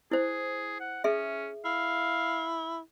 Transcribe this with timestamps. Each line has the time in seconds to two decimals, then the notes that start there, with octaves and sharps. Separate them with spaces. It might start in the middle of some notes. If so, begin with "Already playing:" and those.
0.11 E4 G#4 C5
0.80 F#5
1.04 C#4 G#4 E5
1.65 E4 F5